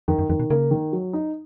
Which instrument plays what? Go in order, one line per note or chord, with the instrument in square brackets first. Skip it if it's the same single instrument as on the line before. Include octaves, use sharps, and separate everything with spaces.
[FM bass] F2 [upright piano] D#3
[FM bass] F#2
[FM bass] F2 [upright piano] D#3
[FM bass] B2
[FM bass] C#3 [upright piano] A#3
[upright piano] D#3
F#3
D#4